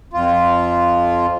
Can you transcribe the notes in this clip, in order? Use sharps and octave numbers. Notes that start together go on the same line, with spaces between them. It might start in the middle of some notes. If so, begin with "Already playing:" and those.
F2 F4